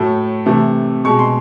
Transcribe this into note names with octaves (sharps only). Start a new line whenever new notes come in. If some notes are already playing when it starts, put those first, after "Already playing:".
Already playing: A2 F#3 A3
C3 E3 A3
B2 G#3 C#6
C6